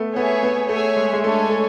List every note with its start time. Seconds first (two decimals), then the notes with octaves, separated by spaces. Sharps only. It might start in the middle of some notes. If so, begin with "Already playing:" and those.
Already playing: A3 B3
0.16 B3 G#4 C#5 E5 G#5
0.43 B3
0.69 A3 G#4 C#5 E5 G#5
0.97 G#3
1.13 G#3
1.23 A3 D4 A4 C#5 G#5
1.50 A3